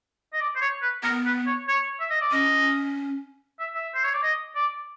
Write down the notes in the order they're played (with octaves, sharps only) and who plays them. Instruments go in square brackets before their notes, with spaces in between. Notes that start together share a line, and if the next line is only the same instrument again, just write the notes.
[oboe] D#5
D5
C5
C#5
B4
[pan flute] B3 [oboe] A#4
[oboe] B4
C#5
C#5
E5
D#5
D5
[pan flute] C#4 [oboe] D#5
[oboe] E5
E5
C5
C#5
D5
D#5
D5